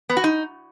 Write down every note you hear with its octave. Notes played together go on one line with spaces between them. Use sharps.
B3
F#4
D#4